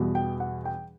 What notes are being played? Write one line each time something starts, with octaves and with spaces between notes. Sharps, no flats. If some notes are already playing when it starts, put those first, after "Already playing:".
Already playing: E2 B2 G3
G5
F#5
G5